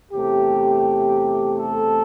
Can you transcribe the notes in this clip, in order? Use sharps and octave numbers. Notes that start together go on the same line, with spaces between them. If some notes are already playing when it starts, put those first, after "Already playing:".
E2 C3 A3 G4
A4